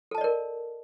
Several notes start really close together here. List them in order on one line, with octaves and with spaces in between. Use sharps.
A4 A5 D#5 D5 A#4